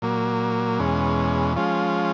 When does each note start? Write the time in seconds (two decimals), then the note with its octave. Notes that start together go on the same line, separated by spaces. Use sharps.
0.02 A#2 F#3 A#3
0.79 E2 B2 G#3 C#4
1.56 F3 G#3 C#4 F4